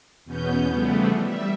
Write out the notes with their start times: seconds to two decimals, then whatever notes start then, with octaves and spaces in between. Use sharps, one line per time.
0.25 E2 B2 B3 C#4 G6
0.71 C#3 E3 F3 G3 A3 B3
1.21 G3 E5